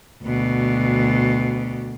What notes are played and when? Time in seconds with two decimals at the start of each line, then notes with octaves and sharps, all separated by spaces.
0.24 D2 B2